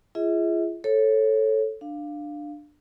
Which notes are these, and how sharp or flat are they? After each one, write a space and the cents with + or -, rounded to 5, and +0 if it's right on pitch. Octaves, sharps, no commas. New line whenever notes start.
F4 -40 G#4 +0 E5 -45
A4 +0 C#5 -20
D4 +15 F5 +0